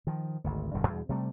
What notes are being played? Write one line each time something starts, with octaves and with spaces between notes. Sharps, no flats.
D#3 F3
G#1 D2
E1 G2 D3
E2 G2 B2
C3 G3 A3